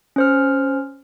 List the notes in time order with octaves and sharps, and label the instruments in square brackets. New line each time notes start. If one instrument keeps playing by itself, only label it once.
[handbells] C#4 C5 F6